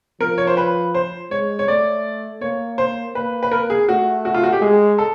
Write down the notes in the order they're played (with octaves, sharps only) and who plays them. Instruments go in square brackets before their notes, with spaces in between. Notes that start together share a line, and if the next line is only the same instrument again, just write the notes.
[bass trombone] F3 [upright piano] A#4
[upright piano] C#5
C5
B4
C5
[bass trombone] G#3 [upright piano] C#5
[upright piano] C#5
[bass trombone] A3 [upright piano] D5
[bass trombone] A#3 [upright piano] C#5
[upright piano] C5
[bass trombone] A#3 [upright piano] B4
[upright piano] B4
A#4
G#4
[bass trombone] A3 [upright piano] F#4
[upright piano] F#4
F4
F#4
G4
[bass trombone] G#3 [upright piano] G#4
[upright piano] A4